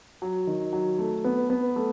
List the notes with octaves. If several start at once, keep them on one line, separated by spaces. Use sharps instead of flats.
F#3
D#3
F#3
A3
B3
B3
A3